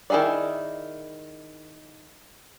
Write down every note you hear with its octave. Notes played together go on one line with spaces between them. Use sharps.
D#3 E4 G#4 A4 D5